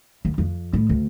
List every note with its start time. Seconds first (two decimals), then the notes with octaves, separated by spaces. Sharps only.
0.25 D#2
0.38 F2
0.73 A2
0.89 D2